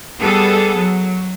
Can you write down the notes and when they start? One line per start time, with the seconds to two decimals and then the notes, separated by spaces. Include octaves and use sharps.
0.19 G3 B3 G#4 A4
0.78 F#3